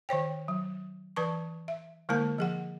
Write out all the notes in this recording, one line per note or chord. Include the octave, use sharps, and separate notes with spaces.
D#3 C5 C#5 G5
F#3
E3 B4 A5 C#6
E5
D3 G#3 A#3 E4 A#4 A5
F3 G#4 F#5